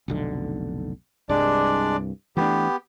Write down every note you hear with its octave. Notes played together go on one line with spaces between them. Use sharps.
F1 B1 D3
C2 G2 G#3 D4 D5
E3 A3 B3 D4 G4